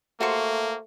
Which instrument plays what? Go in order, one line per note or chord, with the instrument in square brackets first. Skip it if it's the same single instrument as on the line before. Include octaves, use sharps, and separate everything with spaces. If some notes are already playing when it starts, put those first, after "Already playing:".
[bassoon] A3 [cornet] A#3 [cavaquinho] F#4 C5 C#6